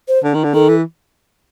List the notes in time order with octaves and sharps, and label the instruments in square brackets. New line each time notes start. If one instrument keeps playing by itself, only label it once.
[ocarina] C5
[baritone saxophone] D3
D#3
D3
[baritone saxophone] D#3 [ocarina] A4
[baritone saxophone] E3